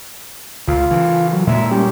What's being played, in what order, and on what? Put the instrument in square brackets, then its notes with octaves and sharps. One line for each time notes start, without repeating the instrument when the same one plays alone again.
[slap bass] C#2 [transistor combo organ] F4
[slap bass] C#3 E3
[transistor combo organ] F#3
[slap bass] A#2 G#3 [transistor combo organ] E5
[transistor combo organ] G3 C#4 G4